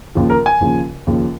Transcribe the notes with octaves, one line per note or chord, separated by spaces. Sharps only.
D#2 C#3 F3
A#4
G#5
D#2 C#3 F3
D#2 C#3 F3